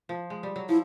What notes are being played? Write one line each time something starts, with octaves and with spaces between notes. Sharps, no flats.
F3
G#3
G3
F#3
F3 E4